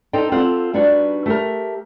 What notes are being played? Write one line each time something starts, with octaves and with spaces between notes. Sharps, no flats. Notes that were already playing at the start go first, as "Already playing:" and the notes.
D#4 A4 C5 G5
C4 F4 A4 F5 F#5
G3 B3 D4 D#4 F#4
A3 G4 A#4